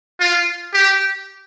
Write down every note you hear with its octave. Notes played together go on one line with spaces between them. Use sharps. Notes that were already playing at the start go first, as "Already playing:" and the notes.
F4
G4